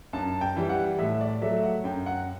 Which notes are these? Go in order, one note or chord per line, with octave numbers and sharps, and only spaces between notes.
F#2 A5
G5
E3 G3
F#5
A2 E5
D5
F#3 A3 E5
F#5
F#2 G5
F#5